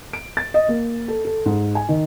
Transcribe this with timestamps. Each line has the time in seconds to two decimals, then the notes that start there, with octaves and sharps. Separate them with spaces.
0.13 D7
0.37 A6
0.54 D#5
0.69 A#3
1.08 A4
1.25 A4
1.46 G#2
1.75 G#5
1.89 D#3